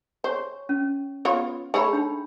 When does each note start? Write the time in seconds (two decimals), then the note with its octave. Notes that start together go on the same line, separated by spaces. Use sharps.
0.24 C5 C#5 G#5 C#6
0.69 C#4
1.25 B3 F4 C#5
1.74 A3 D#4 G#4 C#5 A#5 B5
1.93 D4 D#4 G5